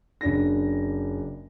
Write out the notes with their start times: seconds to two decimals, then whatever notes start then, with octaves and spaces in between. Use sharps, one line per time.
0.21 F#1 D4 A#6